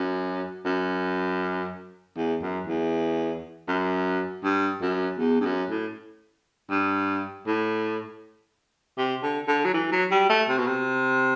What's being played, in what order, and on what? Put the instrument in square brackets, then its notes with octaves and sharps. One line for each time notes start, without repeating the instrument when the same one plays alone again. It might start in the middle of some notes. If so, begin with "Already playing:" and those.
Already playing: [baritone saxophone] F#2
F#2
E2
F#2
E2
F#2
G2
F#2
E2
G2
F#2
A2
G2
A2
C3
D3
D3
F#3
E3
F#3
G3
A3
C3
B2
C3